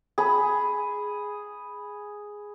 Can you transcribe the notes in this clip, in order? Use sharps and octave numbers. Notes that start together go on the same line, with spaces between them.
G#4 B5